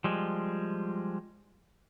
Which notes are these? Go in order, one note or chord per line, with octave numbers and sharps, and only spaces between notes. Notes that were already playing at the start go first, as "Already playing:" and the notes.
F3 G3 G#3